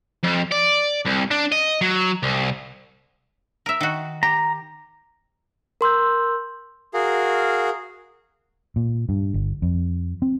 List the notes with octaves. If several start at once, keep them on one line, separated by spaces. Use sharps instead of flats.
F2
D5
C2
D4
D#5
F#3
C2
A#4 E5
D#3 F#4
G4 A#5
A#4 C6 E6 G6
F#4 G#4 A#4 F5
A#2
G2
G1
F2
C4